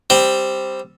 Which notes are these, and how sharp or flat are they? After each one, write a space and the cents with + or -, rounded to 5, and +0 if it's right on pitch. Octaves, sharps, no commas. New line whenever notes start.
G3 +0 C4 +0